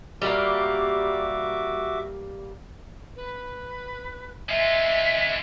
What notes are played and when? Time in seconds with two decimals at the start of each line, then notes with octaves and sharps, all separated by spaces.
0.22 G3 A#3 F#4 E5 D6
3.15 B4
4.49 G#3 F4 E5